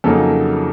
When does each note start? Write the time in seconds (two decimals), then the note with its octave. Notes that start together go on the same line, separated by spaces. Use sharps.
0.04 F2 C#3 F#3 A#3 D#4 A4